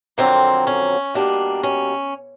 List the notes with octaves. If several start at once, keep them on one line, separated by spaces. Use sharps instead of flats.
F2 D3 F#3 A#3 C4
C#4
B2 G3 A#3 D4
C#4